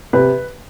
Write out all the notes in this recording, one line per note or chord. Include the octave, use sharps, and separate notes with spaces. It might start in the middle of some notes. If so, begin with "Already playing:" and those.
C3 B4